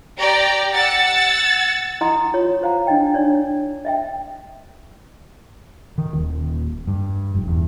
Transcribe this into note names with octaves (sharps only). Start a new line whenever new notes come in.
G4 D5 A#5
F#5 E6 A6
E4 D#5 F#5 A#5 C6 D#6
F4 C#5 C#6
C5 F5 F#5 A#5
D4 E4 D#5 G5
D4 D#4 C#5 D5
D#5 E5 G5
D#3
D#1
G2
F1
E2